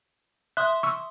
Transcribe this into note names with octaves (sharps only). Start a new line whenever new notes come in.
E5 C6 D#6 F#6
C#6 E6